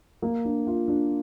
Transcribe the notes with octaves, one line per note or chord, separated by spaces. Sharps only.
A#3
D4
F4
D4